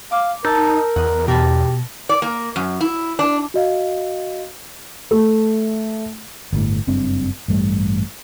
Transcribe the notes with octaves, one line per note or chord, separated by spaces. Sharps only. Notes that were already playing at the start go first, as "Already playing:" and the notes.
F5 D6
D#4 A#4 A5 A#5 E6 G6
E2 D#5 F#5
B2 G4 A#4 A5 B5
D5
A#3
F#2
E4
D4
F#4 D#5 F5
A3
G1 A2
F#1 G2 C4 D4
A1 G2 G3 A3